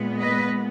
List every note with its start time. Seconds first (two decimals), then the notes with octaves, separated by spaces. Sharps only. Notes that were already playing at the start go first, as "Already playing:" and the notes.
Already playing: A#2 G#3 B3
0.18 B4 D#5